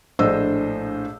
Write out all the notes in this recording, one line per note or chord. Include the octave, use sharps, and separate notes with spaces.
A#1 A2 D4 C5 D#5 E6